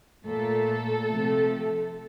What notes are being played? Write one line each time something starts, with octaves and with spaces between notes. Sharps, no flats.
A#2 A3 A4
C3 F3 A3